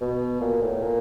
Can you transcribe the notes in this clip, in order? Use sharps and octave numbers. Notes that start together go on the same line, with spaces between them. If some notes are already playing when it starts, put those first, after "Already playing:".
B2
A#2
A2
A#2